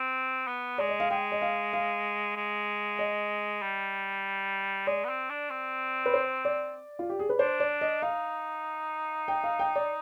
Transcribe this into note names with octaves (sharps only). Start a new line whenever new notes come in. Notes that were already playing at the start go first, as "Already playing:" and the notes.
Already playing: C4
B3
G#3 D5
D#5
F5
G#3 G5
D#5
F5
F5
G#3
D#5
G3
G#3 D5
B3
C4
D4
C4
B4
C5
D5
F4
G4
G#4
B4
D4 C5
D5
D#5
D#4 F5
G5
F5
G5
D5